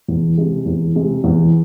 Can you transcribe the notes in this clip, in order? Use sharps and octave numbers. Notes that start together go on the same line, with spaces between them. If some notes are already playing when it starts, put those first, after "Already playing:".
E2
C3 G#3
E2
C3 G#3
E2